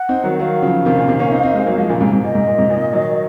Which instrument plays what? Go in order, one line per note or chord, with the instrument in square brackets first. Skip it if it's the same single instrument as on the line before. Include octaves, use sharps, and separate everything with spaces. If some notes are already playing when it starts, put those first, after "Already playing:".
Already playing: [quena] F#5
[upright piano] C4 D#4
D#3 F#3
[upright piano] D#3 F#3 [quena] F5
[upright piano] C#3 F3
C3 D#3
A#2 C#3
C3 D#3
A#3 C#4
C4 D#4
C4 D#4
G#3 C4
F#3 A#3
F3 G#3
A#2 C#3
G#2 C3
G#2 C3
[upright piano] A#2 [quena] D#5
[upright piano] G#2
A#2
G#2 C3
A#2
D#3 F#3